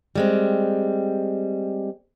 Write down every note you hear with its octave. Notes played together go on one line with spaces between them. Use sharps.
G3 G#3 C4